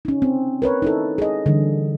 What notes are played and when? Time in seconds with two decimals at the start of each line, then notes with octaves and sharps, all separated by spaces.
0.05 C#4 D#4
0.22 C4
0.62 A#4 B4 C#5
0.82 D#4 E4 A4
1.18 G#4 D#5
1.46 D3 E3 G3